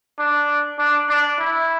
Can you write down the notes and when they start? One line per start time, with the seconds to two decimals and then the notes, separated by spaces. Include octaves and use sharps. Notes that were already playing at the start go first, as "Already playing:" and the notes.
0.19 D4
0.79 D4
1.09 D4
1.39 E4